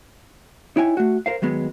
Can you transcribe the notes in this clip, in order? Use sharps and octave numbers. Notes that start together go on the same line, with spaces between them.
D#4 E4 C#5 G5 G#5
A3 F#4
A#4 C5 F5
D#3 F#3 G#3 B3